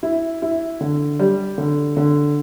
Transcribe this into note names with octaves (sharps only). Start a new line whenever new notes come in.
E4
E4
D3
G3
D3
D3